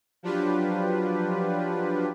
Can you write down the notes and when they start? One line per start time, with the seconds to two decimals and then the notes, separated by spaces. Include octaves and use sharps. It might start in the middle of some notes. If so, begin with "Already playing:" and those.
0.23 F3 F#3 D4 F4 G4 B4